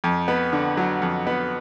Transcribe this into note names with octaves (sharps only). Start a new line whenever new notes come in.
F2
B3
D3
F#3
F2
B3